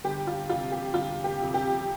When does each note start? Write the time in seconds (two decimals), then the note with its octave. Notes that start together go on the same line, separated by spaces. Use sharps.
0.04 G1 G4
0.27 F4
0.49 F2 F4
0.52 C3
0.72 G4
0.93 G1 F4
1.24 G4
1.39 F2 C3
1.54 G4